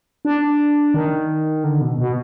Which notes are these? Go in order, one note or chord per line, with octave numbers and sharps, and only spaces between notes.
D4
D#3
D3
B2
B2